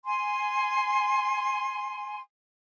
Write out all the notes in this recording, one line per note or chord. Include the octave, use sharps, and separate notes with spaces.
G#5 C6